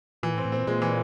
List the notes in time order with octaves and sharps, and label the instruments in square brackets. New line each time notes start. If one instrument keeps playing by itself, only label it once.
[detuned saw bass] A#2 [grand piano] E3
[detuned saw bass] A2
[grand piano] C4
[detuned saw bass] A2
[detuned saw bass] A#2 [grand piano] C4
[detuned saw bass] A#2 [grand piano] G#3
[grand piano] E3